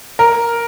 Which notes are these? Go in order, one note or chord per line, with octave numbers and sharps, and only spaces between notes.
A#4